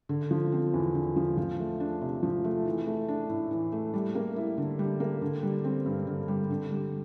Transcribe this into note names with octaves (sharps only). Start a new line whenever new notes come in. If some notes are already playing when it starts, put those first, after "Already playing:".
D3
F3
C4
E2
D3
F3
F3
A3
D4
C3
F3
A3
E3
A3
D4
A2
E3
A3
G3
A#3
E4
D3
G3
A#3
D3
G3
C4
G2
D3
G3
D3
G3